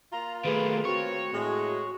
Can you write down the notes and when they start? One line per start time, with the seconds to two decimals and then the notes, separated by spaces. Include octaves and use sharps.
0.12 A#3 F4 A#5
0.45 D#3 A3 G#4 B4
0.85 C4 F#4 C#5
1.34 A2 G#3